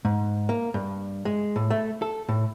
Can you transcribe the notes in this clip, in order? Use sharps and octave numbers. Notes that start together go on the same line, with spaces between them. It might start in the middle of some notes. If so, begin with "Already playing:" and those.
G#2
A#3
G2
G#3
A2
A3
A4
A2